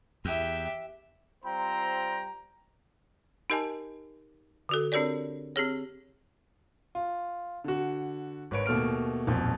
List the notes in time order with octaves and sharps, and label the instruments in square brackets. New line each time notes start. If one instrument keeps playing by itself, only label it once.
[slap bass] E2 [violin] G4 E5
[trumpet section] G3 C4 F4 C5 G5 A#5
[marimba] D#4 G4 A#4 D#5 G#5 A5
D3 F#4 A4
C4 D4 G4 A#4 C#5 D5
C4 G4 G#4 C#5
[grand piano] F4
D3 F#4
G#1 B4 C#5 D7
D#2 B2 A3 F6 D7
D#1 B1 F2